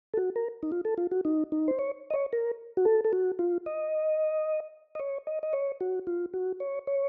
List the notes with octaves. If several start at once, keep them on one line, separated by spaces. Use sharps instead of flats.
A4
F#4
A#4
D#4
F4
A4
F4
F#4
D#4
D#4
C5
C#5
D#5
C#5
A#4
F#4
A4
A4
F#4
F4
D#5
D#5
C#5
D#5
D#5
C#5
F#4
F4
F#4
C#5
C#5